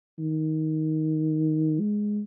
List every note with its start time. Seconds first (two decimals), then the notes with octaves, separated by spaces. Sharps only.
0.19 D#3
1.80 G#3